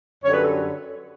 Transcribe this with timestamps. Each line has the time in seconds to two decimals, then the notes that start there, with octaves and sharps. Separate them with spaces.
0.23 F#2 D3 G3 C#5
0.34 B4
0.43 A4